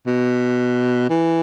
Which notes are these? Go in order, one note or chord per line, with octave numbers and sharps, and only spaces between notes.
B2
E3